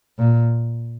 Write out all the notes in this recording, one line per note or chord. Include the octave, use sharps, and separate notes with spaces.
A#2